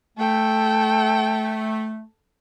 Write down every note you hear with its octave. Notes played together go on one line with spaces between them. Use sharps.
A3 A4 G5